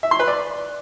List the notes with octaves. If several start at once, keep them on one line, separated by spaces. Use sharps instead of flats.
E5
C6
B4
D5